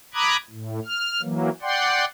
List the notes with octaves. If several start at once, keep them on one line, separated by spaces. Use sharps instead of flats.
A#5 B5 D6 D#6 F#6 G#6
A2
F6
E3 F#3 A#3
D5 F#5 G5 C6